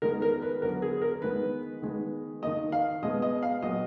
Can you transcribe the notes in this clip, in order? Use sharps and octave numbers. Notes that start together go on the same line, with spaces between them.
D#3 G#3 B3 A#4
A#4
B4
D3 F#3 B3 A#4
G#4
A#4
D#3 G#3 B3 B4
D#3 G#3 B3
D#3 A#3 D#5
F5
B2 G#3 B3 D#5
D#5
F5
A#2 F#3 B3 D#5